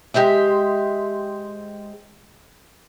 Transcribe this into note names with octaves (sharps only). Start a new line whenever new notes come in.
G#3 G4 C5 E5